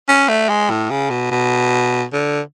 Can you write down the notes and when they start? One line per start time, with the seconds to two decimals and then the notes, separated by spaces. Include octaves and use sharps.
0.08 C#4
0.29 A3
0.49 G#3
0.70 A2
0.90 C#3
1.10 B2
1.31 B2
2.13 D3